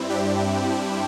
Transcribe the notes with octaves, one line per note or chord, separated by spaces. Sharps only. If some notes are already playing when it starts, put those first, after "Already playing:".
Already playing: G2 G3 C4 E4
D4 G4